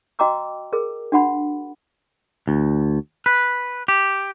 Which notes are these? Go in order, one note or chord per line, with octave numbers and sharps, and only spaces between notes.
F#4 D#5 G5 A#5 D6 E6
G#4 A#4
D4 F#4 F#5 B5
D2
B4
G4